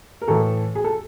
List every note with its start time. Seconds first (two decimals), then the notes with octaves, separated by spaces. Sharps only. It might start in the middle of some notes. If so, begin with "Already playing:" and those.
0.22 A#4
0.28 A2 E3 A4
0.75 G#4
0.84 A4